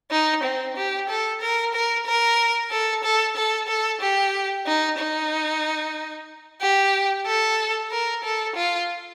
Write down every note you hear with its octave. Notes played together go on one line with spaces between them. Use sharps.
D#4
C4
G4
A4
A#4
A#4
A#4
A4
A4
A4
A4
G4
D#4
D#4
G4
A4
A#4
A4
F4